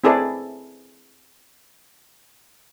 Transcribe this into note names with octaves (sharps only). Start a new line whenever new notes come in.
C4 E4 G#4 A4 B4 D5